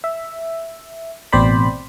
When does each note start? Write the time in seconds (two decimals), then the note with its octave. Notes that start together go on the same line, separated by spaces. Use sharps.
0.04 E5
1.33 A1 B2 C4 C5 D5 B5